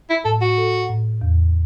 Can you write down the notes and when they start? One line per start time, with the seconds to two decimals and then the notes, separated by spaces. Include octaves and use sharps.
0.10 E4
0.25 A2 A4
0.42 F#4
0.58 A4
0.89 A2
1.22 E2